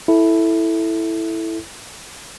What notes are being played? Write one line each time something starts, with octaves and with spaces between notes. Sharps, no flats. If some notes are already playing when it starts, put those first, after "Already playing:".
E4 A4